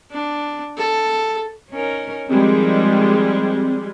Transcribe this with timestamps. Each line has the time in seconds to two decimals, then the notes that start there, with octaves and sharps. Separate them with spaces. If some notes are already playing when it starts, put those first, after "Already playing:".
0.11 D4
0.77 A4
1.70 C#4 D#4 A#4
2.29 D#3 F3 G3 G#3 C4